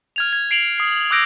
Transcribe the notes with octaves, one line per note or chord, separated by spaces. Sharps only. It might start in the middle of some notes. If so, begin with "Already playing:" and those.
F6 G#6 F7
G#6
C7 D7 F7 F#7
D#6 C7
D6 E6 F#6 G6 A#6 D7